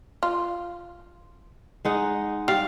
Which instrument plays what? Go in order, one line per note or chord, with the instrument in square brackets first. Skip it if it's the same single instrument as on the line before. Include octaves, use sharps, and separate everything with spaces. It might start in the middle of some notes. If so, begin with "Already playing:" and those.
[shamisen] F4
[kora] G#3 D#4 F#5
[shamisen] G3 [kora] F5